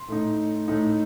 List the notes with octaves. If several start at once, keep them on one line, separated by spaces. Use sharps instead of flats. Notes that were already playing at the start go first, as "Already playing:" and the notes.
Already playing: C6
A2 A3 D#4
A2 A3 D#4